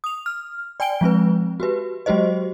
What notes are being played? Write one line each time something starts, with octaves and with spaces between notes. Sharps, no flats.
D#6 F7
F6
D5 G5 G#5 D7 G7
F3 G#3 C4 B4
F#4 G4 B4
F#3 G#3 F#4 G4 C5 D#5